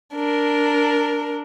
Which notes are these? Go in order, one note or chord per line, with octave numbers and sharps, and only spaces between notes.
D4 A#4